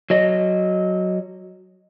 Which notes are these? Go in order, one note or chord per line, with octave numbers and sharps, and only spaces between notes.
F#3 D#5